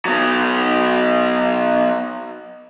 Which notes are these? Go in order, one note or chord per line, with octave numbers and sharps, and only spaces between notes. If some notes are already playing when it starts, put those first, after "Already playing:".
F#3 B3